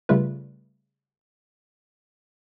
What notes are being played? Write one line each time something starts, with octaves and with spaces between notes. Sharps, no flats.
C#3 G3 A3 F4 B4